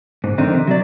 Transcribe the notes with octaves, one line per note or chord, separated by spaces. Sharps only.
G#2
F2 D#3 C4 D4 D#4
C3
F#3 D5